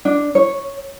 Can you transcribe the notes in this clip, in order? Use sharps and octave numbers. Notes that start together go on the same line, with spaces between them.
D4
C#5